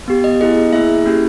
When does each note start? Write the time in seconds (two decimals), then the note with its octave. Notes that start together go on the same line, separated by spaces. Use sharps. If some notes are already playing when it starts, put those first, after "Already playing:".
0.08 B3 G4
0.24 D#5
0.41 B3 E4 G#4 D#5
0.73 A#3 E4 G#4 E5
1.06 A#3 C#4 E4 G4